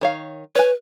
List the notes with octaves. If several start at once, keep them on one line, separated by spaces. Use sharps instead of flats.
D#3 C#5 F5
B4 C#5 G#5